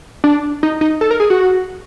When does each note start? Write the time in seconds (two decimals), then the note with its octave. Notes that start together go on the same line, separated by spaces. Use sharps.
0.24 D4
0.63 D#4
0.81 D#4
1.01 A4
1.11 A#4
1.20 G#4
1.30 F#4